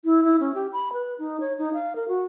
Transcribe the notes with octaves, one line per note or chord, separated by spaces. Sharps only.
E4
E4
C#4
G4
B5
B4
D#4
C#5
D#4
F5
A#4
F#4